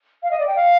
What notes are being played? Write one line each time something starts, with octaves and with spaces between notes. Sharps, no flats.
F5
D#5
D5
G5
F5